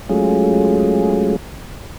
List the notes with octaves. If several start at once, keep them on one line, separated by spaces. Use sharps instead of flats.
F#3 G#3 A3 C#4 F4 G#4